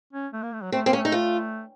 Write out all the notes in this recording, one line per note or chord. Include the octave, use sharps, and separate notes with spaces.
C#4
A3
A#3
A3
F#3
A3 C4
A#3 C4
C#4
A3
D#4
F4